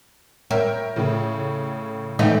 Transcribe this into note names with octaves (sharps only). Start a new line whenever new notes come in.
E4 A#4 C#5 G5
A2 C#3
E3 A3 D#4 D#5 G5